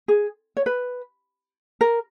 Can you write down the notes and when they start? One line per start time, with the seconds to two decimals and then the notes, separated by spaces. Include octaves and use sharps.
0.08 G#4
0.57 C#5
0.66 B4
1.81 A#4